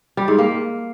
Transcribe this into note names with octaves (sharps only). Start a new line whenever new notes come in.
G3
G#2
A#3